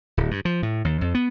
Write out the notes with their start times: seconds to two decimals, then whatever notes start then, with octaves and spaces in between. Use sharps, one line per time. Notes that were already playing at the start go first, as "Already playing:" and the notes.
0.17 D1
0.31 G2
0.45 F3
0.63 A2
0.84 D#2
1.01 F2
1.15 B3